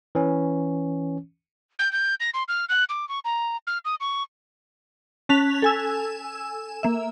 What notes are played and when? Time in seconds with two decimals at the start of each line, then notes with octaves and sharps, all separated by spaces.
0.15 E3 C#4
1.79 G6
1.93 G6
2.20 A#6
2.34 C6
2.48 F6
2.69 F#6
2.89 D6
3.09 C#6
3.25 A#5
3.67 F6
3.85 D#6
4.01 C#6
5.29 C#4 A5 F#6 B6 F7
5.62 A4 G#5 E6
6.83 A#3 E5